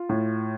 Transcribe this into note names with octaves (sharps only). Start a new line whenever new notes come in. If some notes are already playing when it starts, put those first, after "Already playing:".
Already playing: F4
A2